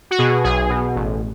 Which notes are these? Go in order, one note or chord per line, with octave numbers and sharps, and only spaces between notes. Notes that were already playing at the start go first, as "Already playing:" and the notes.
F#4
B2 G#4
B1 G#4
B2
A1